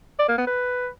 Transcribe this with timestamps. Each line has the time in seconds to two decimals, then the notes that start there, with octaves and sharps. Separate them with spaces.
0.19 D5
0.29 A#3
0.38 B3
0.47 B4